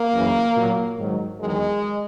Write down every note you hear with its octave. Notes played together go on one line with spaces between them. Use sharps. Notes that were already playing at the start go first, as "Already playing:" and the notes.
Already playing: A#3
F#2 C#3 E3
A#2 F#3
G#2 D#3 F#3
E2 D#3 F#3 G#3